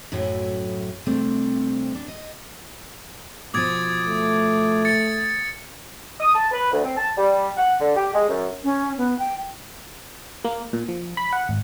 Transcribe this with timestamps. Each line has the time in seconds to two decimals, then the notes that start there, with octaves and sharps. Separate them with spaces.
0.12 F#2 A2 F#3 A3 C#4 E4
1.06 C3 G3 A3 C4 D4
1.95 D4
2.08 D#5
3.54 B2 F3 D6 D#6 G#6 A6
4.06 A3
4.85 A6 C#7
6.20 D#6
6.34 A5
6.51 B4
6.72 D2
6.83 C4
6.97 A5
7.17 G3
7.57 F#5
7.80 D3
7.96 G4
8.14 G#3
8.29 F#2
8.64 C#4
8.98 B3
9.19 G5
10.45 A#3
10.73 A#2
10.89 F3
11.17 B5
11.33 F#5
11.49 G#1